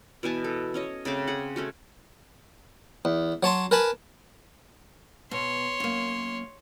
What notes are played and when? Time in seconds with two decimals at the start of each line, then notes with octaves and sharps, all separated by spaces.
0.23 B2 E3 G#5 A5
0.44 A4
0.74 C#4 C#5 D#5
1.05 C#3 A3 C4 D6
1.27 G#4 F#5
1.56 A3 C#4 F#4
3.05 E2
3.43 F#3 C#5 A5 C6
3.71 A#4 B4 G#5 A5 B5
5.31 B2 C#5 C6
5.80 F#2 A#3